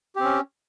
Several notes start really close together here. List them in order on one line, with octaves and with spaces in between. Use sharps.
G4 C4 C#4